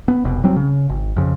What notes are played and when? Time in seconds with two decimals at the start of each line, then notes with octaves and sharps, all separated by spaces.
0.08 B3
0.24 F1 C2 B2
0.43 C2 F#3 G3 C4
0.56 C#3
0.89 G#1
1.16 F2 C#3